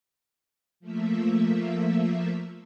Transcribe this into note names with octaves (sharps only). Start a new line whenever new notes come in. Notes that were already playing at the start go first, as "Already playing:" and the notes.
F3 A3 A#3 E5